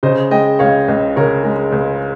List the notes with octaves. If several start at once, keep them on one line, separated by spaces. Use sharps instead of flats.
C#3 C5 D#5
G#3 D#5 G5
C#2 C#5 F5
C#2
C#3 A#4 C#5
G#3
C#2